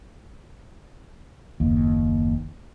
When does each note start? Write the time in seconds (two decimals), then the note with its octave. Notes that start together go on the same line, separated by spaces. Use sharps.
1.60 F#1 D#2